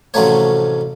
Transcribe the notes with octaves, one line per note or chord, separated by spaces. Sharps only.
A1 C3 F3 F#3 A3 C#5